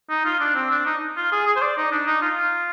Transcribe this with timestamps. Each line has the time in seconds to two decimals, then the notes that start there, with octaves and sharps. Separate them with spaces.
0.10 D#4
0.25 F4
0.40 D4
0.55 C4
0.70 D4
0.86 D#4
1.17 F4
1.32 G#4
1.46 G#4
1.56 C5
1.62 D5
1.77 D#4
1.92 D4
2.07 D#4
2.22 F4